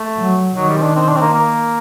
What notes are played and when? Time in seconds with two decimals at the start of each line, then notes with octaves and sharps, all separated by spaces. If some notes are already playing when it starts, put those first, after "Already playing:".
Already playing: A3
0.17 F#3
0.56 D#3 F#3
0.69 G3
0.78 C4
0.82 D4
0.96 C4
1.09 D4
1.17 C4
1.21 A#3
1.34 A#3